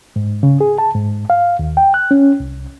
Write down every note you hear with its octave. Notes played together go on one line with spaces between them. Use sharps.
G#2
C#3
G#4
A5
G#2
F5
D#2
G5
F#6
C#4
C2